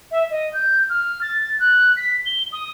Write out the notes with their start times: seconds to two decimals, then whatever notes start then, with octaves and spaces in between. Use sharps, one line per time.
0.11 E5
0.30 D#5
0.53 G6
0.89 F6
1.22 A6
1.59 F#6
1.97 B6
2.26 G7
2.52 D#6